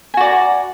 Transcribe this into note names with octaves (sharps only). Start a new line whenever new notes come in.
F#4 D5 G#5 A#5